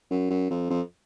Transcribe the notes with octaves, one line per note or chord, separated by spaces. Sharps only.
F#2
F#2
F2
F2